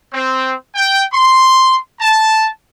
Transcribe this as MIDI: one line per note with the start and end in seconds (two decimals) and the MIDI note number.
0.12 0.54 60
0.75 1.03 79
1.12 1.78 84
2.00 2.49 81